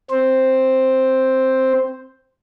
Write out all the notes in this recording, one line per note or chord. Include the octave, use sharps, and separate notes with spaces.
C4 C5